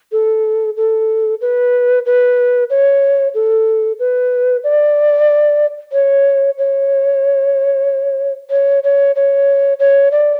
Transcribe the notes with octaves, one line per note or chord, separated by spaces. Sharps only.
A4
A4
B4
B4
C#5
A4
B4
D5
C#5
C#5
C#5
C#5
C#5
C#5
D5